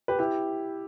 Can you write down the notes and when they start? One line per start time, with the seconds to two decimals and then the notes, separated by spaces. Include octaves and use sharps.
0.08 G4 B4
0.19 E4 G4